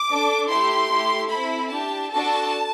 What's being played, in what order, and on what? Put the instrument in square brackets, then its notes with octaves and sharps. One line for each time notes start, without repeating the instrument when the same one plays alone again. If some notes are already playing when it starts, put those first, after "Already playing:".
Already playing: [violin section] D6
D4 A4
A3 E4 G4 C6
A3 E4 G4
C4 E4 A4 B5
D4 G4 A5
D4 F#4 A4 A5